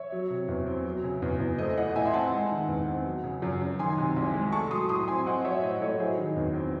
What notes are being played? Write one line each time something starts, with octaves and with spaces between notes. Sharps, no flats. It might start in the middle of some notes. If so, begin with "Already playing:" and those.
Already playing: C#5 E5
F#3
C3
E2
C4
F#3
C#3
E2
E2
A3 C5 D#5
E3 D#5 F#5
A2 E5 G#5
C6
C4 F#5 A5
G#3
D#3
E2
C4
F#3
C#3
F#2
F#2
D#3 G#5 C6
C3
C2
G#3
A3 A5 C#6
F#3 C6 D#6
A2 C6 D#6
C4 G#5 C6
C4 D#5 F#5
F#3 C#5 E5
A2 C5 D#5
A2 A4 C#5
F#3 G#4 C5
D#3
E2
C4